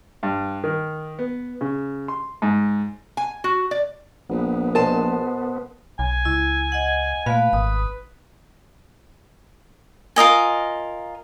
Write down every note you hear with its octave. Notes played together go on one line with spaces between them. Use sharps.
G2
D#3
B3
C#3
C6
G#2
G#5
F#4
D5
A#1 B3
B2 A#4 C5 A5
B1 G#5
C#2 E4
D#5 F#5
A#2 A3 B4 F5
G#1 D#6
F4 A#4 D#5 G#5